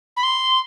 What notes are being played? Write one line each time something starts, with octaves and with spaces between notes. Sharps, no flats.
B5
C6